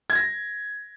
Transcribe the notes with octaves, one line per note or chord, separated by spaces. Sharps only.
G#6
A#6